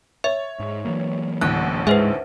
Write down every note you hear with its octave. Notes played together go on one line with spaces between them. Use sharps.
C#5 E5
G#2
E3 F#3 A#3
A1 D2 A2 F#6
G#2 G#3 B4 C5 E5